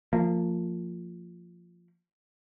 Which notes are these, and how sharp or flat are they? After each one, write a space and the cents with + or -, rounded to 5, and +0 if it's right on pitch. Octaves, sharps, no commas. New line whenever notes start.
F3 +0 A#3 -30